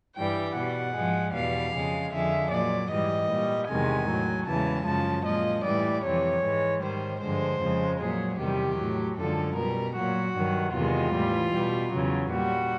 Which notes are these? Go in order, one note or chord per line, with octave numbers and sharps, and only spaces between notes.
G2 E3 G3 G5
B2 G3 F#5
G#2 F3 G#3
E2 B2 G3 F5
F2 C#3 F3 G#3
F2 D3 F3 G#3 E5
A#2 F#3 D5
G#2 E3 G3 D#5
A#2 G3
E2 C3 D#3 G#3 G#5
A2 F#3
E2 C#3 E3 G#3 A5
F#2 C#3 F3 G#3 A5
A#2 F3 G#3 D#5
A2 E3 G3 D5
F2 C3 E3 C#5
G#2 E3 G#3
G#2 D#3 G3 C5
G2 D3 F3 G#3 C5
F2 C#3 F3 G#3
A#2 F#3 G#4
E2 C3 D#3 G3 G4
A2 F#3
F#2 D3 F3 G#3 A4
B2 G3 A#4
A#2 F#3 F#4
G2 D#3 F#3
E2 C3 D#3 G#3 F4
A2 E3 G3
B2 G3
E2 C#3 F#3
A#2 G3 F#4